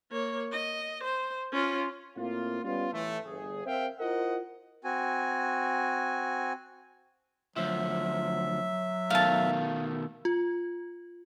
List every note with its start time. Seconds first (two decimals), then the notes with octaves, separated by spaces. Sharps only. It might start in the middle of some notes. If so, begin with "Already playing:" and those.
0.12 A#3 C#5
0.52 D#5
1.03 C5
1.52 C#4 F4
2.16 A2 A#3 C4 F4
2.64 G3 B3 C#4 F4
2.93 A2 E3 A3
3.26 G1 G#4
3.66 C4 A#4 C5 E5 F5 G5
4.00 E4 F4 A#4 C5 D#5 F#5
4.84 C4 F#4 G#5
7.56 D2 F3 F#3 E5
9.10 B2 D#3 A3 F5 A5
10.25 F4